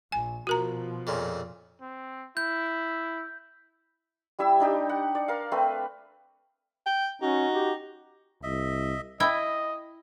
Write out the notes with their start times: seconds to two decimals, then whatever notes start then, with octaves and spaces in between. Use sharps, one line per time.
0.12 A#1 G#5
0.47 B2 F3 F#4 A#4 A#5
1.07 F2 A#2 C#3
1.81 C4
2.37 E4 G6
4.39 G3 E4 E5 E6
4.60 D4 D#4 G4
4.89 F#5
5.15 D5
5.28 A#4 F5
5.52 A3 C4 B4
6.86 G5
7.22 C#4 D#4 F#4
7.54 G4
8.43 C2 D#5 E5
9.20 E4 D#5 G5